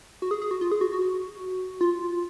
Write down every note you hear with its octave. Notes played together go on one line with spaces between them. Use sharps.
F#4
G#4
G#4
F#4
F4
G#4
F#4
F#4
F4